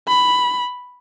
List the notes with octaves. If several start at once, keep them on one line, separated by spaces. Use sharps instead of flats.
B5